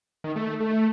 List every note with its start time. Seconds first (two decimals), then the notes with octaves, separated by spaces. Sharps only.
0.24 D#3
0.36 A3
0.60 A3
0.76 A3